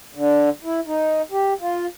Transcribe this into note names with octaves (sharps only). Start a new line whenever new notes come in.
D3
E4
D#4
G4
F4